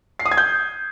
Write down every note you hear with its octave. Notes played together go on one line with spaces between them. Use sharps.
C7
D#6
G#6
G6